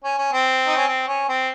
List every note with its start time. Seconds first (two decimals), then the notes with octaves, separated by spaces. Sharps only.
0.04 C#4
0.18 C#4
0.32 C4
0.67 D#4
0.77 C#4
0.87 C4
1.07 C#4
1.29 C4